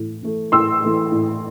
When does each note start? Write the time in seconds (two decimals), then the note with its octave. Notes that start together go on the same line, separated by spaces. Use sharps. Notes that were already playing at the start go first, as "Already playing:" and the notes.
Already playing: A2 E3 A3
0.23 E3 A3
0.52 A2 C6 E6
0.82 E3 A3
1.12 A2